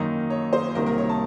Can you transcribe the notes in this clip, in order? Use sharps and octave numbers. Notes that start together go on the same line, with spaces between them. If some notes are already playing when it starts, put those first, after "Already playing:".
Already playing: F#2 D#3 A#3 D#4
C#5
C5
C2 C3 D#3 A#3 A#4
A#4
C#5
A5